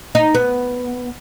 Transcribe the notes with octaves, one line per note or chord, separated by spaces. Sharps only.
D#4
B3